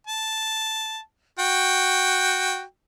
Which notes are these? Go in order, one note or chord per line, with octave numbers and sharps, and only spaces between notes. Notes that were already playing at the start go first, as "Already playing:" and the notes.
A5
F#4 G5